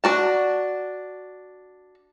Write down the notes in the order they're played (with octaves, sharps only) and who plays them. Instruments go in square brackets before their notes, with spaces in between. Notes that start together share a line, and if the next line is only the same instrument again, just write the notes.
[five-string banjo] D4 F#4 A5